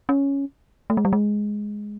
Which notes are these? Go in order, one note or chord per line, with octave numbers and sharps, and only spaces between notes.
C#4
A3
G#3
G3
G#3